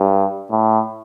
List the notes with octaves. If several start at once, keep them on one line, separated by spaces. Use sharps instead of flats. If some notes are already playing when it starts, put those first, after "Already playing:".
Already playing: G2
A2